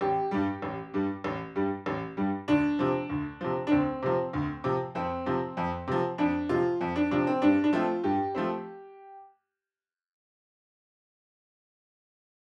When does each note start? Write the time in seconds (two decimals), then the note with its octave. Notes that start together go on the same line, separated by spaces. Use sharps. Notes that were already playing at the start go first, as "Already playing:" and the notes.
0.01 A1 G4
0.31 G2 G3
0.62 A1
0.94 G2 G3
1.24 A1
1.55 G2 G3
1.86 A1
2.17 G2 G3
2.48 D2 D4
2.79 C3 F3
3.09 D2
3.41 C3 F3
3.67 D4
3.71 D2 C4
4.02 C3 F3
4.33 D2
4.64 C3 F3
4.95 F2 C4
5.26 C3 F3
5.57 F2
5.87 C3 F3
6.18 F2 D4
6.49 C3 F3 F4
6.81 F2
6.96 D4
7.11 C3 F3 D4
7.27 C4
7.42 G2 D4
7.64 D4
7.73 F3 A3 C4 F4
8.04 G2 G4
8.35 F3 A3 C4